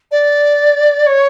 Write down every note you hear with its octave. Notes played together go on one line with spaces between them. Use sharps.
D5
C#5